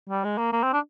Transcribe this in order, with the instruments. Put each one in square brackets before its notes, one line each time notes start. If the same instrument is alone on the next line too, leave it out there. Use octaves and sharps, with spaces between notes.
[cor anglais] G3
G#3
A#3
A#3
C4
D4